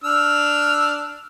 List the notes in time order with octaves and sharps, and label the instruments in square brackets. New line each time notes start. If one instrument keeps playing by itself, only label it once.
[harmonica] D4 E6 F6